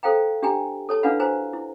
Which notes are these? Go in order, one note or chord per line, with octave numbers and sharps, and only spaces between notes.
A4 C5 F5 G5 A#5
D4 G4 G5 G#5 A#5
A4 C#5 A5
D4 E4 B4 F5 F#5 B5
F#4 C5 G#5 A#5
E4